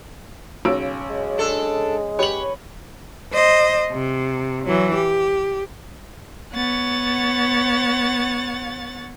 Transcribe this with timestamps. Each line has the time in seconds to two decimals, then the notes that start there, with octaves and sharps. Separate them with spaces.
0.65 B1 C#3 E6 D7
1.10 G#3
1.38 D4 A4
2.19 G4 B4 C#5 F#7
3.33 C5 D#5
3.92 C3
4.65 E3 F#3
4.95 G4
6.54 B3 C#5 F#5 A6